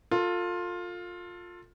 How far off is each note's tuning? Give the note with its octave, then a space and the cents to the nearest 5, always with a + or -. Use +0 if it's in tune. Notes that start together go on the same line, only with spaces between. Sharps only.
F4 +15 A4 +30